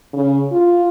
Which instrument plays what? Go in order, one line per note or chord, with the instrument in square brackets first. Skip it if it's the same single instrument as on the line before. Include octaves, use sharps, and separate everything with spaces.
[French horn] C#3
F4